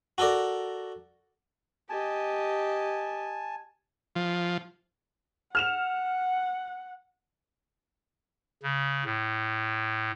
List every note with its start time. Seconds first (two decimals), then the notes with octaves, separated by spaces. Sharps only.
0.18 F#4 A4 A#4 D5
1.90 G4 D#5 G#5 A5
4.16 F3
5.55 F#5 F6 E7 F7
8.63 C#3
9.05 A2